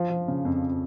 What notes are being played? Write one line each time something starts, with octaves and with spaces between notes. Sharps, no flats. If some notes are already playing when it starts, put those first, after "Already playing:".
Already playing: F3
F3
C#3
F2